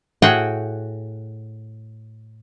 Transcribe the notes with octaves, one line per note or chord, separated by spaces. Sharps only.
A2 F#4 G#4 F#5 G5